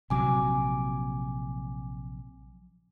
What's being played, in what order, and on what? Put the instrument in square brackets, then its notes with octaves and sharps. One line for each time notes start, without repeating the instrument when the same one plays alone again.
[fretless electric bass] A#1 C3 F#3 [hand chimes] G#5 D6